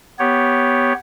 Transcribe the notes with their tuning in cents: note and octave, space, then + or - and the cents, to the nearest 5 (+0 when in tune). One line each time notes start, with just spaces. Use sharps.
B3 +0 G4 +0 C#5 +0